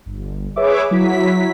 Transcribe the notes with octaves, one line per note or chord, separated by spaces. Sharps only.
G1
G#4 B4 C#5 E5 D6
F#3 E4 B6